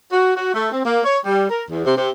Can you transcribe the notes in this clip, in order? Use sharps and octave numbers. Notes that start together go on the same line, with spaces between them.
F#4
F#4
A3
C4
A#3
C#5
G3
A#4
E2
C3
C3